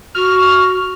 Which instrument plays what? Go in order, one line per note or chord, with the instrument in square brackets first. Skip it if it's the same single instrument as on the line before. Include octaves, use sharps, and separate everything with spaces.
[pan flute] F#4 [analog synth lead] F6